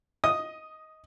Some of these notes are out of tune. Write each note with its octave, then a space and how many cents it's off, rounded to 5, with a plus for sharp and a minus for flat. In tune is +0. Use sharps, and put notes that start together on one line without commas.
D#5 +15 D#6 +0